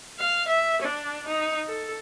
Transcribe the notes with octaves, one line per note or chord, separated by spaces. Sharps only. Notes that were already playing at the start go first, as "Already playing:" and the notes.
F5
E5
D4
D#4
A4